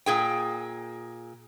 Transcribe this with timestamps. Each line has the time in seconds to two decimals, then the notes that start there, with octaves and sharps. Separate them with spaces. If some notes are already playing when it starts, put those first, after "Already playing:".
0.06 A#2 G#4 G5